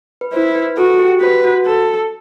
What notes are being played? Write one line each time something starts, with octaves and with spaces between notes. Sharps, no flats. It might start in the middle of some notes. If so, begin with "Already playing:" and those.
B4
E4 C5
B4
F#4 A4
G4
F#4 B4
F#4
A4